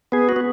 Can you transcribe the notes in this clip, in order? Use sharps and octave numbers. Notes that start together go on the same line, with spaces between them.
B3 G#4
F#4
B3